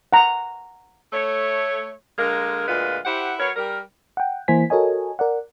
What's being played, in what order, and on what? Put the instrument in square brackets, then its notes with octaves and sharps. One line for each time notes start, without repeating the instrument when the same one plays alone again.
[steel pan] F#5 A#5
[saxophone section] A3 C#5
D3 G#3 A#3 A#4
D2 A#2 G#3 F4 B4
E4 G4 C5 F#5
F#3 A#4 B4 C#5
G3 A#4
[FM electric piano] F#5 G5
E3 A#3 E4 C5 G#5 B6
F#4 A4 A#4 C#5 D#5 G#5
A#4 D5 F#5